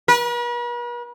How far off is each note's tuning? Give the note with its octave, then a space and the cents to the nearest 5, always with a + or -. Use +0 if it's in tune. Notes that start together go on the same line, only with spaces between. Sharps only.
B4 -45